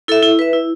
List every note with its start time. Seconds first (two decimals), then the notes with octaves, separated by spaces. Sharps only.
0.08 E4 A4 E5
0.22 E4
0.39 B4 E5
0.53 E4